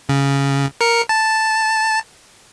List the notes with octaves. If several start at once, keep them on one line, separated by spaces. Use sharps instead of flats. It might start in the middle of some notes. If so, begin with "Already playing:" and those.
C#3
A#4 C#7
A5